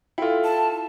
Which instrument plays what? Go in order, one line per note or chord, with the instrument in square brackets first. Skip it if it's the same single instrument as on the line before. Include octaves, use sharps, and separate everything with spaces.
[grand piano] E4 F4 [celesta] A4 G5
[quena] A5